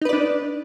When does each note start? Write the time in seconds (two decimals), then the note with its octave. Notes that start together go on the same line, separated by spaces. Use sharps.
0.01 D#4
0.05 B4
0.09 D5
0.13 D4